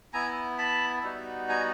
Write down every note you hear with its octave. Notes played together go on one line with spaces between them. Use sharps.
B3 E4 G#5 A#5
A5 B5
G3 B3 D#4 F#4
G#5 A#5